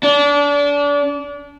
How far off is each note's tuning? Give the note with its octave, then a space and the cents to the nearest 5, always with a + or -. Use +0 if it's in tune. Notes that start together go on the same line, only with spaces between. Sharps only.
D4 -30